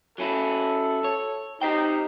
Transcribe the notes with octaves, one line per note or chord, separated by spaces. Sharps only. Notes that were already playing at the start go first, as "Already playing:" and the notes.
F#3 C#4 E4 A4
C#5
D#4 G4 C5 G5